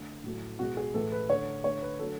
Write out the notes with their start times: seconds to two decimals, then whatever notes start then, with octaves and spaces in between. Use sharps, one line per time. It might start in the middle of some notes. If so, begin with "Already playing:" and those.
Already playing: D3 A3
0.24 A2 F#3 A3
0.59 B2 G#3 F#4
0.77 G#4
0.94 A2 E3 A3 A4
1.12 B4
1.29 D3 A3 C#5
1.64 D3 A3 C#5
1.82 B4
1.99 D3 F#3 A3 A4